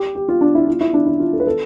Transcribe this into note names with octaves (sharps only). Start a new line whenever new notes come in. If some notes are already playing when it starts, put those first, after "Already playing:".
Already playing: G4
G4
F4
D4
E4
F4
E4
D4
E4
F4
A4
B4
A4